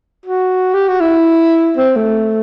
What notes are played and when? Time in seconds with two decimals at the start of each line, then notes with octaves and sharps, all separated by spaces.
0.26 F#4
0.74 G4
0.88 F#4
1.01 E4
1.77 C4
1.96 A3